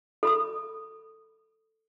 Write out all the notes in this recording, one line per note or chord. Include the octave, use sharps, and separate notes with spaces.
A4 B5 D#6